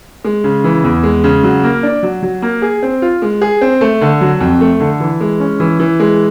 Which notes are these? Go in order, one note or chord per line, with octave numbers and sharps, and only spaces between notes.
G#3
C#3
E3
E2
G#3
C#3
F#3
A#3
D4
F#3
F#3
A#3
G#4
C4
F4
G#3
G#4
C4
A3
D3
F#3
F2
A3
D3
E3
G#3
C#4
E3
E3
G#3